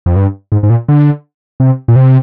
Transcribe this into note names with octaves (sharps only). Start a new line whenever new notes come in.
F2
G2
G#2
G#2
A#2
D3
C3
A#2
C3